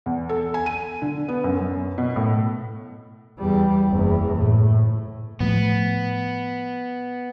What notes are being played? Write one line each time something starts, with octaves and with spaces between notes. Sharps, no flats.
E2
A4
G#5
D#7
D3
B3
F#2
F#2
B2
A2
E2 G3
F#1 E2
A2
A2 F3 A3 B3